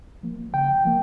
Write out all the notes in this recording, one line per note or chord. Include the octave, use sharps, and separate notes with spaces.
F3 A#3
C#3 G5
F3 A#3